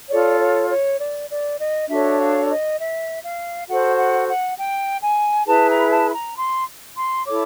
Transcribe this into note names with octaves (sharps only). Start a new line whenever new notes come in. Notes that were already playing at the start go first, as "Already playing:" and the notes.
F4 A4 C#5 D5
C#5
C#5
D5
D5
D#5
D4 F#4 A4 C#5 E5
F5
D5
D#5
E5
F5
F#4 A4 C5 F#5
F#5
F#5
G5
G#5
E4 G#4 B4 A5
A#5
A5
B5
A#5
C6
C6
E4 A4 C#5 D6